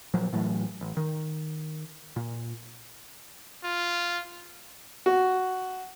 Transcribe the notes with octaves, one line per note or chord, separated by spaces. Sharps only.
A#2 F3 F#3
A2 E3 F#3 A3
A1
D#3
A#2
F4
F#4